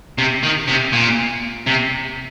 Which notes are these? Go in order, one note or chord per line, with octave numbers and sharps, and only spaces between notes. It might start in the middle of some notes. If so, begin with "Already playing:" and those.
C3
D#3
C3
A#2
C3